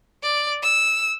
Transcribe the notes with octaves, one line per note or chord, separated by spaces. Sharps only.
D5
E6